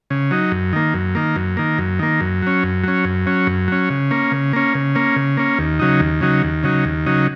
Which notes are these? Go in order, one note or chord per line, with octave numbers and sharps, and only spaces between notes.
C#3
F#3 D#4
F#2
D#3 A#3
F#2
D#3 A#3
F#2
D#3 A#3
F#2
D#3 A#3
F#2
F#3 C#4
F#2
F#3 C#4
F#2
F#3 C#4
F#2
F#3 C#4
C#3
A#3 C#4
C#3
A#3 C#4
C#3
A#3 C#4
C#3
A#3 C#4
D#2
C#3 F#3 D#4
D#2
C#3 F#3 D#4
D#2
C#3 F#3 D#4
D#2
C#3 F#3 D#4